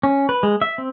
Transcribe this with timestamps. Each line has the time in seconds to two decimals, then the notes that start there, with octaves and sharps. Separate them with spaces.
0.03 C#4
0.29 B4
0.43 G#3
0.61 E5
0.78 C4